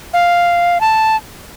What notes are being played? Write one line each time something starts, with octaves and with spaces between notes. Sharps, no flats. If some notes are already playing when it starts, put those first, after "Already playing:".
F5
A5